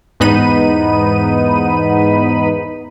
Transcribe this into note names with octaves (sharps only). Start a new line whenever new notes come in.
E2 G#2 B3 D#4 B5 D#7